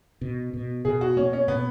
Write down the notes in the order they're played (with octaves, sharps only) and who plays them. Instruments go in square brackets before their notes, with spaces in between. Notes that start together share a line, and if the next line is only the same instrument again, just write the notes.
[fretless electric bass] B2
B2
[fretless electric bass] B2 [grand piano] G#4
[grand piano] F#4
[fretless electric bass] A#3 [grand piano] C#4
[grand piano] C#4
[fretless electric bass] B2 [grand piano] B3